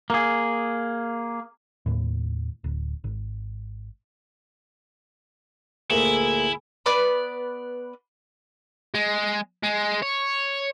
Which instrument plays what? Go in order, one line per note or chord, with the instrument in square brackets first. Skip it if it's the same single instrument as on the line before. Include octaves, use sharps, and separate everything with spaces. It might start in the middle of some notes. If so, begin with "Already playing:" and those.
[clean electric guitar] A#3 G#4
[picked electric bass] D#2 A2
D1
G#1
[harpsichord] D2 A#2 [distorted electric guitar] E4 [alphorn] G#4
[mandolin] B3 B4 D5 B5
[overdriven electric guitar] G#3
G#3
C#5